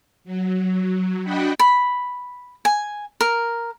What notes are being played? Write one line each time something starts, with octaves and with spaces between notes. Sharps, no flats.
F#3
D4 F#4 D#5 F#5 G5 B5
B5
G#5
A#4